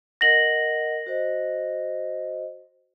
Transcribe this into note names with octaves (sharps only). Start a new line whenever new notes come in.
A#4 D#5 F#5 A#6 F#7
F#4 C5 D#5